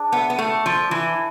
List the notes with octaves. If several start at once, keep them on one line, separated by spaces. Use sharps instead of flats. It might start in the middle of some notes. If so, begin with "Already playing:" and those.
Already playing: D4 G#4
B3 E5
B3
A3 A4
F3 A4
E3 E4